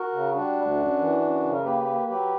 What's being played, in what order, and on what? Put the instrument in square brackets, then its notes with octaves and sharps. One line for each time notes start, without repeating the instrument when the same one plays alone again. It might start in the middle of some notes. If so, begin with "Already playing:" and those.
Already playing: [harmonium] F#4 A#4
C#3
G3 D4 F#4
D2
F#2
E3
F#2
C#3
A#4
A#3 G4 B4
A#3
F#3 G4 B4